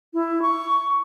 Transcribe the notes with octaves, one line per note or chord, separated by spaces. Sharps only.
E4
C#6